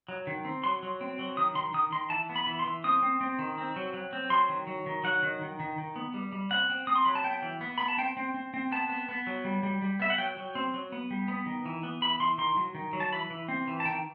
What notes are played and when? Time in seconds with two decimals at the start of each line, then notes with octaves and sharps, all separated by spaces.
0.08 F#3
0.27 D#3
0.45 C4
0.64 F#3 C6
0.83 F#3
1.01 C4
1.19 F#3
1.37 D#3 D#6
1.55 D#3 C6
1.74 D#3 D#6
1.92 D#3 C6
2.10 E3 A5
2.29 B3
2.36 B5
2.47 E3
2.59 C6
2.66 E3
2.84 C4 D#6
3.03 C4
3.21 C4
3.39 D#3
3.58 C4
3.76 F#3
3.94 F#3
4.13 C4
4.30 F#3 C6
4.49 D#3
4.67 F#3
4.86 D#3
5.04 F#3 F#5
5.23 D#3
5.41 D#3
5.60 D#3
5.78 D#3
5.96 B3
6.14 G3
6.32 G3
6.51 C4 F#5
6.70 C4
6.87 C4 D#6
6.95 C6
7.05 F#3 B5
7.15 A5
7.24 B3 G5
7.42 E3
7.61 B3
7.78 B3 B5
7.88 A5
7.97 C4 G5
8.17 C4
8.34 C4
8.54 C4
8.72 B3 A5
8.89 B3
9.09 B3
9.27 F#3
9.45 G3
9.63 G3
9.82 G3
10.00 B3 E5
10.10 F#5
10.18 F#3 G5
10.37 F#3
10.55 C4
10.74 F#3
10.92 B3
11.11 G3
11.28 B3
11.46 D#3
11.66 E3
11.83 B3
12.02 E3 B5
12.20 E3 C6
12.38 D#3 C6
12.56 F#3
12.75 D#3
12.93 F#3
13.00 A5
13.12 E3 B5
13.30 E3
13.49 C4
13.68 E3
13.80 A5
13.85 D#3 G5